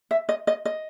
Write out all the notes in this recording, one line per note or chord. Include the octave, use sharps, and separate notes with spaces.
E5
D#5
D#5
D#5